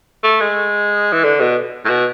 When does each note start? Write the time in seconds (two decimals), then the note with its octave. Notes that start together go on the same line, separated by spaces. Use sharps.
0.24 A3
0.41 G#3
1.13 E3
1.24 D3
1.40 B2
1.85 A2
1.90 B2